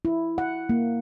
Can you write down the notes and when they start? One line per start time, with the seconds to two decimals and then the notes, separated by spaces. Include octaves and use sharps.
0.05 E4
0.38 F#5
0.69 A#3